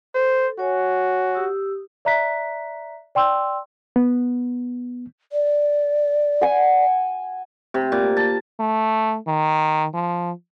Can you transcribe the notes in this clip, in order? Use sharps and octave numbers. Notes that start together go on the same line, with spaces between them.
A4 C5
F#4 C#5 G#5
G4 D#6 E6
D5 E5 A#5 F#6 B6
D5 G5 C6 E6
B3
D5
F#5 G#5
C3
A#2
A5
A3
D#3
F3